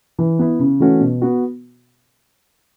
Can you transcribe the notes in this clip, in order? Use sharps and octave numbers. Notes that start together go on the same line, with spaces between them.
E3
B3 E4
C#3
E3 A3 C#4 F#4
B2
B3 F#4